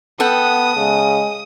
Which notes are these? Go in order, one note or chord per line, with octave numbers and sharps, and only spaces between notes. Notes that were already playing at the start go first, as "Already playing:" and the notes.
B3 A4 F#5 G5 D#6
C#3 G#3